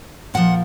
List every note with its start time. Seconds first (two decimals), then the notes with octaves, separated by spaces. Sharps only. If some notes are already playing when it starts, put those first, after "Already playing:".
0.34 A#2 F3 F#5